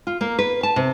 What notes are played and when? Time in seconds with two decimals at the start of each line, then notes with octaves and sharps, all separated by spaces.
0.07 F4
0.21 A#3
0.39 B4
0.63 A5
0.76 C3